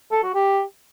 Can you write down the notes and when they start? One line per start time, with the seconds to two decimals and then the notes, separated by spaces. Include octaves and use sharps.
0.12 A4
0.23 F#4
0.34 G4